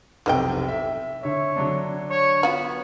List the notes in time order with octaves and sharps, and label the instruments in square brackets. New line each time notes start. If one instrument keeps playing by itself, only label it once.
[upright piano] F1 B1 C3 [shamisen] E3 D#5 G5
[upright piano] E5
[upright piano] D3 E5 [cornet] C#5
[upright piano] D3 F#3 D4
[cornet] C#5
[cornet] B3 [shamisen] F4 F#4